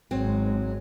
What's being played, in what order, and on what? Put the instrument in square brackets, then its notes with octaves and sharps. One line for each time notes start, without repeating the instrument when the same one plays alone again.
[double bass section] G#1 G#3 [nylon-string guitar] F#3 C4